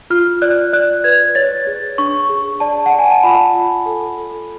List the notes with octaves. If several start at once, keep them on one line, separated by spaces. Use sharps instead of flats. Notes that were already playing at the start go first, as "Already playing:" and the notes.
F4 F6
D5 F#6
D5 F#6
B4 G#6
C#5 A6
G#4
D4 C#6
G#4
D5 A5
F#5
D5
G#5
A5
F4 B5
F4
A4
A4